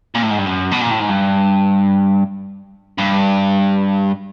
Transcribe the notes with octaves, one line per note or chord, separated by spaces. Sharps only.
A#2
A2
G#2
G2
F#2
B2
A#2
A2
G#2
G2
G2